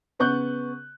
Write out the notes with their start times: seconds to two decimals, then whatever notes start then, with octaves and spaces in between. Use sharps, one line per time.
0.19 C#3 B3 C#6 F#6 G6